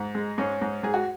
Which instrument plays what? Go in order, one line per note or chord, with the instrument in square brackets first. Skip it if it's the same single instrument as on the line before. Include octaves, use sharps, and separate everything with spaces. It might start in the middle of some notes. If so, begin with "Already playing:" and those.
Already playing: [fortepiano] G#2
G#3
G#2 C#4
G#2
G#2 G#4
F#4